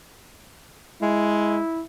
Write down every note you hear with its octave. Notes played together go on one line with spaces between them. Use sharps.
G#3 E4